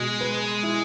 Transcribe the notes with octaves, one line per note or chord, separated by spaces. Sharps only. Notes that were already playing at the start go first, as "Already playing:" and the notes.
Already playing: B2 G#3
B4
E4